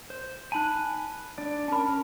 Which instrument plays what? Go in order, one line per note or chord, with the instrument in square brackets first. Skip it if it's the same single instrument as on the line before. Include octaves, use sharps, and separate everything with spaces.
[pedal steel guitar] C5
[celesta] D#4 A5 [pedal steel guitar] G#5 B5 F#6
[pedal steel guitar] D4 D5
[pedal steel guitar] C#4 A#4 [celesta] A5 B5